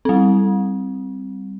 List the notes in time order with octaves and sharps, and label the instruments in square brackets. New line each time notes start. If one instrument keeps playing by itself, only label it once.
[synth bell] G3 C4